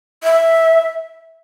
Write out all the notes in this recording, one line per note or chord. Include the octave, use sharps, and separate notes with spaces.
E5